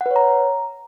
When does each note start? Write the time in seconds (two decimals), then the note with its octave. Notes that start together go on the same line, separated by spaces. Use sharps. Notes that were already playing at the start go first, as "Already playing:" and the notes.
0.01 F#5
0.06 B4
0.11 C#5
0.16 A#5